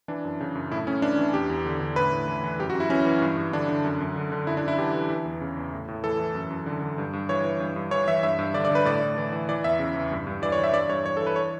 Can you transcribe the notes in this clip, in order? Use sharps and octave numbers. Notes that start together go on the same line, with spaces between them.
E3 D4
F#2
C#3
F#2
A2 E4
A2 C#4
E3 D4
E3
E2 G4
E2
D3
D3
A2 B4
A2
E3
E3
F#2 G4
F#4
F#2
E4
E3 C#4
E3
G2
G2
D3 D4
D3
F#2
F#2
D3
D3
F#2 E4
D4
F#2 E4
E3 G4
E3
E3
E2
C#3
E2
A2
A2
E3 A4
E3
F#2
F#2
D3
D3
G2
G2
E3 C#5
E3
G2
G2
E3 C#5
E3 E5
G2 E5
G2
D3 D5
D5
D3
B4
A2 D5
A2
E3
E3
E3 D5
E2 E5
C#3
E2
G2
G2
E3 D5
C#5
E3
E5
G2 D5
G2 C#5
E3 C#5
E3 A4
B4
C#5